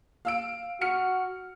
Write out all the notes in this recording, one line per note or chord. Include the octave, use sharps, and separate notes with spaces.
F5 E6 D7
F#4 F6 C#7